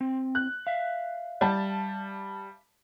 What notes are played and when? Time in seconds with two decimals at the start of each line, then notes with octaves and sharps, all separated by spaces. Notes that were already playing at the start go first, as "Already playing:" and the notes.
0.01 C4
0.35 F#6
0.67 E5 F5
1.41 G3 A5